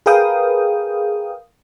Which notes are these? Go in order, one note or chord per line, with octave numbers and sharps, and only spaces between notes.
G#4 A#4 B4 F5 G5 D#6